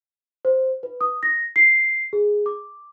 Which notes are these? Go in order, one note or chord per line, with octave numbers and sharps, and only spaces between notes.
C5
B4
D#6
A#6
C7
G#4
D6